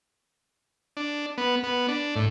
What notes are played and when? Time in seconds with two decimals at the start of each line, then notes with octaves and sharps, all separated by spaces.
0.97 D4
1.38 B3
1.63 B3
1.88 D4
2.16 A2